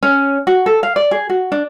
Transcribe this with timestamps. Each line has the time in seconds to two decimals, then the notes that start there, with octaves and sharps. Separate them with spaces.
0.03 C#4
0.47 F#4
0.66 A4
0.83 F5
0.96 D5
1.11 G#4
1.29 F#4
1.52 D4